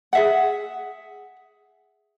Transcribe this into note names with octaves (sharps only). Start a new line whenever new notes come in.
G#4 E5 F#5